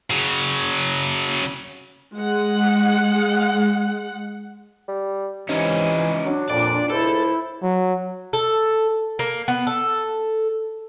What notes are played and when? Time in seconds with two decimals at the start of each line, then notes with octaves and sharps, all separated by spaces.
0.11 C#3 F#3
2.17 G#3 F#5
4.88 G3
5.49 C3 E3 C#4 D#4
6.26 F#3 D4
6.50 F2 A#2 D5
6.90 C#2 E4 A4 C5
7.63 F#3
8.33 A4
9.19 A#3
9.48 B3
9.67 A4